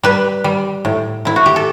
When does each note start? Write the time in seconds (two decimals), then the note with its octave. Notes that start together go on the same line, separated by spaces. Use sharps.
0.03 G3 B4
0.44 G3
0.85 A2
1.25 A2 E4
1.36 F#4
1.46 G4
1.56 A4